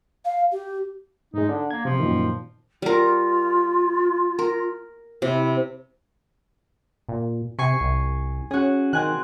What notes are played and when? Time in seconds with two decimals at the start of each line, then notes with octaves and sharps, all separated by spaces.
0.25 F5
0.52 G4
1.34 G#2 G#3 D#4
1.49 D3 D4
1.71 A#3 G#6
1.85 C3 F3
2.00 F#2 A#2 D#3
2.82 G3 F4 A#4
4.39 A#4
5.22 C3 E4
7.09 A#2
7.59 C3 G#5 C#6 C7
7.81 C2
8.51 C#4 F#4 G#4
8.93 D#3 C4 G#5 F#6